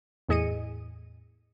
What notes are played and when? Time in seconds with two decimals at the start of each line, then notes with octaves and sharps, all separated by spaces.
0.29 E2 A2 G#4 D#5 C#7 D#7